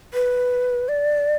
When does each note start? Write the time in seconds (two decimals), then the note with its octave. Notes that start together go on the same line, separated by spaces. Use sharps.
0.14 B4
0.89 D5